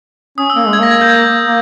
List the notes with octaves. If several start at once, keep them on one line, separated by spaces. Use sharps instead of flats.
C#4 D#6
E6
A#3
G#3
G#6
A#3 A#6
G#6
G6
G#6
A#3